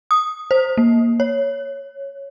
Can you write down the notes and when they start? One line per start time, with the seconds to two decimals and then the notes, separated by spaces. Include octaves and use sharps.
0.11 D#6
0.51 C5
0.77 A#3
1.20 C#5